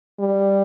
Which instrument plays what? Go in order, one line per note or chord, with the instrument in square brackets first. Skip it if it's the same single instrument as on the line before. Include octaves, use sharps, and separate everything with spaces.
[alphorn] G3